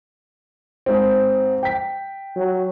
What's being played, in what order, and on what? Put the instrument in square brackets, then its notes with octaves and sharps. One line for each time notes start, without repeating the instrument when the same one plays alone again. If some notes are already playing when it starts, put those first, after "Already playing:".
[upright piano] G#2 C4
G5 B6
[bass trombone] F#3